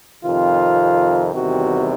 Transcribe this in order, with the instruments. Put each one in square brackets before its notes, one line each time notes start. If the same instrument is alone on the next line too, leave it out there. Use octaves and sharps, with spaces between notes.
[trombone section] F2 C3 D#3 F4
E2 C3 D#3 G3 F#4